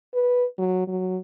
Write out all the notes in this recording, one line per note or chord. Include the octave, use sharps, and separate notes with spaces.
B4
F#3
F#3